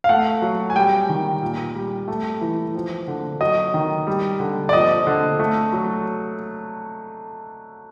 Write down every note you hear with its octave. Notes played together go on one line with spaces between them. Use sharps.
F5
A3 F#5
F#3
G#5
G3 G5
D#3
A#2
G3
A3
E3
F3
D3
F#3 D#5
D#3
G3
D3
D5
F3 D#5
D3
A3
F#3